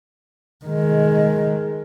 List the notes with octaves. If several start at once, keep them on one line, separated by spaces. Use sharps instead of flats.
D#3 G#3